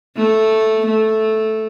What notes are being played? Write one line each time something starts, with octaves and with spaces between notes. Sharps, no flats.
A3
A3